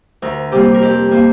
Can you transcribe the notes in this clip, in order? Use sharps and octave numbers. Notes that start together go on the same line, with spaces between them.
D2 A#4
C3 G3 A#3 G4
A#4
F2 G4
F3 A#3